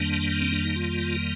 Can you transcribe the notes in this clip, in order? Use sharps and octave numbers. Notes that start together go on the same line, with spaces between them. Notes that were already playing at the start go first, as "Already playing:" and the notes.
Already playing: F2 D#3 G3 A#3 D4
C4
D4
D#4
F4